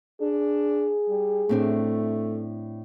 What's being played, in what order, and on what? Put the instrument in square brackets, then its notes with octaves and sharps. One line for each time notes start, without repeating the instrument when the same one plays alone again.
[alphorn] D4 [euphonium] G#4
[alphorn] G3
[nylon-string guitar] A2 C4 D4 [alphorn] A3